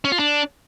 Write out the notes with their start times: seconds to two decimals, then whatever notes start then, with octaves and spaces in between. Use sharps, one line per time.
0.05 C#4
0.12 F4
0.19 D4